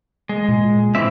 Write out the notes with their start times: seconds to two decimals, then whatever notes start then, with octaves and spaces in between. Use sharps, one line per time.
0.29 G#3
0.49 A#2
0.95 E3 C4 E5